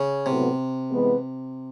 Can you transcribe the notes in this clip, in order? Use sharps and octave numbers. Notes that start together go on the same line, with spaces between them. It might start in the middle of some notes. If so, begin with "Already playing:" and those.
Already playing: C#3
A2 C3 F#3 B3
E3 G#3 B3